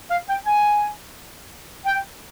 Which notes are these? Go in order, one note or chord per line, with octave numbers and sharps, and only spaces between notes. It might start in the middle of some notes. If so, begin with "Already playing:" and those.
F5
G5
G#5
G5